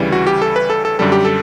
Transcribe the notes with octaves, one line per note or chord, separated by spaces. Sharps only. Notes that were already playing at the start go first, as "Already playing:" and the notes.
Already playing: D2 C#3 E3 G3
F#4
G4
A4
B4
A4
A4
F#2 D3 G3 A4
G4
A4